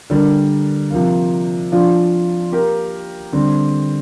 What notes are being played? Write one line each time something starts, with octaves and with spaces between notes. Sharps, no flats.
D3 G3 D4 A#4 D5
C3 F3 A#3
F3 D4 F4
A#3 G4 A#4
D3 G3 C4